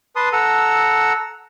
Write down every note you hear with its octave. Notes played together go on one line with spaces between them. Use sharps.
B4 A5 C6 D#6
A4 F#5 A#5 E6